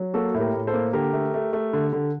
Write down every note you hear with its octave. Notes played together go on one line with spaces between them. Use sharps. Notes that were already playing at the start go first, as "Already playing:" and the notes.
Already playing: F#3
A#3 F#4 A4
A2
G4 A#4
A2
A4 C5
A#3
D3 G4 A#4
A3
A3
A3
D3
D3